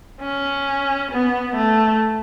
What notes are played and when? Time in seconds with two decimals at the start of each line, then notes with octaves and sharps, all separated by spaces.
0.21 C#4
1.11 B3
1.56 A3